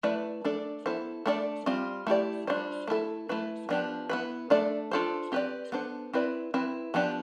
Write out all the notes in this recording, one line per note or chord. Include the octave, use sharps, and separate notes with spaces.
A3 E4 B4 D5
A3 D4 A4 D5
B3 E4 A4 C5
A3 D4 A4 D5
G3 C4 F4
A3 E4 G4 D5
G3 D4 F4 C5
A3 E4 A4
A3 E4 B4
F3 B3 D4 G4
B3 E4 B4
A3 D4 A4 D5
D4 F4 A4 C5
C4 G4 B4 D5
B3 D4 A4 C5
C4 E4 B4 D5
C4 E4 B4
F3 B3 D4 G4